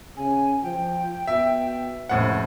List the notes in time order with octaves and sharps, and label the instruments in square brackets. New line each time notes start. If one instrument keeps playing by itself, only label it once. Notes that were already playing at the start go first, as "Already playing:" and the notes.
[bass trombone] C#3 [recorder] G#5
[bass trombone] F3 [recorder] G5
[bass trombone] B2 [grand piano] E5
[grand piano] F1 A2 F#5 [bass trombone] C#2 [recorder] C5